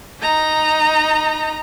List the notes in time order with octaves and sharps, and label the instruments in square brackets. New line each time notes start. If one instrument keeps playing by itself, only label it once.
[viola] D#4 A#5